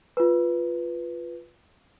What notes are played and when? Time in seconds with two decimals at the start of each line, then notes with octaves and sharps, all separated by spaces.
0.17 F4 B4